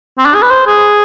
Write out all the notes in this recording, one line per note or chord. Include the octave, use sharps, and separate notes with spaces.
C4
D4
G#4
B4
C5
G#4